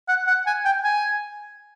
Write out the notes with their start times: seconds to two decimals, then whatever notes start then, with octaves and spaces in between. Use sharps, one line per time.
0.08 F#5
0.27 F#5
0.47 G#5
0.65 G5
0.84 G#5